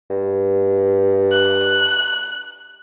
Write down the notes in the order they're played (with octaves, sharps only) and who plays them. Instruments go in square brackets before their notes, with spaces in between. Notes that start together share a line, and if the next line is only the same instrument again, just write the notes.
[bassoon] G2
[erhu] F#6